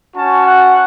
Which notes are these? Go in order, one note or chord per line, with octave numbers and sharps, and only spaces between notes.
C#4 F#4 A5
F#5